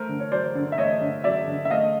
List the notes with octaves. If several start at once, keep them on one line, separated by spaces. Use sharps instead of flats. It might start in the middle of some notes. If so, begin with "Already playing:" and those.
Already playing: A3 A#4 C5
D3
C#5
F#3 C5 D5
D3
E5
A3 C#5 D#5
D3
F#3 D5 E5
D3
E5
A3 D#5 F5